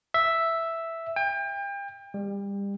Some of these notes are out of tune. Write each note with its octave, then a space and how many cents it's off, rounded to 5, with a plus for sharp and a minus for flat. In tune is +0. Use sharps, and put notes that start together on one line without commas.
E5 +0
G5 +35
G3 +30